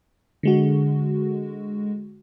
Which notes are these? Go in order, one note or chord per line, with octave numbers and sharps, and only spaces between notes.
D3 G#3 F#4